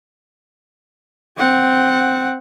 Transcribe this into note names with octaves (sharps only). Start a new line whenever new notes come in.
C4 F#5